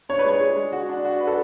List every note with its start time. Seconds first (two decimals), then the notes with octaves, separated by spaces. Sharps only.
0.09 D4 C#5
0.19 B4
0.25 G#3 C#5
0.41 G#3
0.56 G#3
0.72 F#4
0.89 D4
1.05 F#4
1.20 B4
1.27 A4